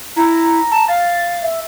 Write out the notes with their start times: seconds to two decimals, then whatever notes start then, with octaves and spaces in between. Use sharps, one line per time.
0.16 E4 A#5
0.71 A5
0.88 F5 A6
1.43 E5